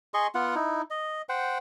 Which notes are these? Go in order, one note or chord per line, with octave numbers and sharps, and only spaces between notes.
G#4 D#5 C6 C#6
B3 F4 F#5
D#4 E4
D#5
C5 F#5 G5